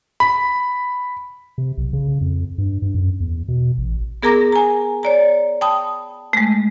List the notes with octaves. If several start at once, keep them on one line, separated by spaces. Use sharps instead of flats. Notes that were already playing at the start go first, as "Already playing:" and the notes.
B5
C3
B1
C#3
C#3
F2
G2
G2
F#2
E2
B2
A1
B3 G#4 A#4 A#5 D6 A#6
G#5 A#5
C#5 D5 A#5
G5 A5 B5 D#6
G#3 A3